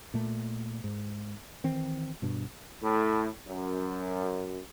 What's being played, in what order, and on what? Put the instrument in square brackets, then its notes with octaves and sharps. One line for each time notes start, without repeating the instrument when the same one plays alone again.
[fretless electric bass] A#2 A3
G#2
D#3 E3 C4
G2 B2 D4
[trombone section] A2
F#2